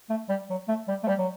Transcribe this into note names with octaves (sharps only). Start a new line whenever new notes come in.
A3
G3
F#3
A3
G3
A3
G3
F#3